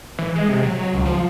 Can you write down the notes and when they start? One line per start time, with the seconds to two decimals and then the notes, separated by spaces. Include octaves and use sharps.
0.18 E3
0.36 G#3
0.49 C3
0.63 F#3
0.93 C#2
1.05 F3